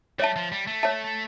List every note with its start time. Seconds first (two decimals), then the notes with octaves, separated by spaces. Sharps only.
0.19 G3 C#5 E5 A5
0.36 F3
0.52 G3
0.67 A3
0.83 C#5 E5 A5